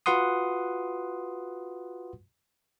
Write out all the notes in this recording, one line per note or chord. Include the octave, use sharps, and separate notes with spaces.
F4 F#4 B4 F#5 C6 D#6